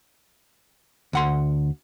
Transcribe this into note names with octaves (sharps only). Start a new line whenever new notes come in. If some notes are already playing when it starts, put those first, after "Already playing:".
D2 F#5 C6